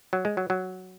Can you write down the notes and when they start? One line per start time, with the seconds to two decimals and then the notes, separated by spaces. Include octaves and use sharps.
0.13 F#3
0.25 G#3
0.37 F#3
0.50 F#3